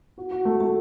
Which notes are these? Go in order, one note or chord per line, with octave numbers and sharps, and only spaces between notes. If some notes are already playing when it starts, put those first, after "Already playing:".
F#4
F#4
A3
A3